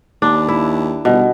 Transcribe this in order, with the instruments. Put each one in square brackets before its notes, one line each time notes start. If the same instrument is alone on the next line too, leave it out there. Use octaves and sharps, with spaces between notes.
[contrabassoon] D#2 [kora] D4
[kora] E4
[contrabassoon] G1 [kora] B2